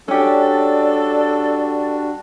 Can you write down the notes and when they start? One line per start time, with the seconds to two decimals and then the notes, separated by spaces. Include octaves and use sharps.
0.08 G3 C#4 D4 F#4 G4 A4 D5